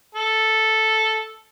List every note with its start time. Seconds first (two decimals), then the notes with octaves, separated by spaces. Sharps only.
0.15 A4